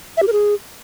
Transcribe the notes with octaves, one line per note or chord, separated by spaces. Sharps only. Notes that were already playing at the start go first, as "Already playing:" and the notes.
E5
G4
A#4
G#4